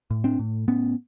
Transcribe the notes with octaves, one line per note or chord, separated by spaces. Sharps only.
A2
C4 D4
A2
A2 B3 C#4